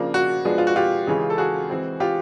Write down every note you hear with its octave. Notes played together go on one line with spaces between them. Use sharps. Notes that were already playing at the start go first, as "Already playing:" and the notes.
Already playing: C#3 F3 A#3 D4
F#4
F3 G#3 B3 D4
F4
F#4
F4 G4
C#3 E3 G#3 C#4
A4
F#4 G#4
E3 G#3 C4
F4 G4